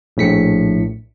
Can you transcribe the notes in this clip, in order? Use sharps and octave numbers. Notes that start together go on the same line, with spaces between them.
A#1 A2 B6 C#7